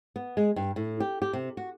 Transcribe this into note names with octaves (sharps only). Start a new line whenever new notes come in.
B3
G#3
G2
A2
G4
G4
C3
F#4